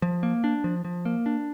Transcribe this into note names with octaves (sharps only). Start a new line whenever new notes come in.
F3
A#3
D4
F3
F3
A#3
D4